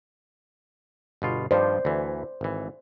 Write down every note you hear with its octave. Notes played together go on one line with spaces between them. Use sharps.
G1 B2 F4
G2 D#3 F3 C5 D5
D2 E3
G#1 E3